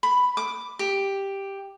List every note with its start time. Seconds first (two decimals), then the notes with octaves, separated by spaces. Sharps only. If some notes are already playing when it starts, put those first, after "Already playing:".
0.03 B5
0.37 D6
0.79 G4